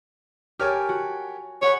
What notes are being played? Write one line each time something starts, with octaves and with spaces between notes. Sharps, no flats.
G4 A#4 C#5 G#5 A5 F6
F#4
G#4 C#5 F#5 B5